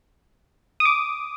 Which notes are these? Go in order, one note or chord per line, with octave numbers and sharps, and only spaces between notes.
D#6
D6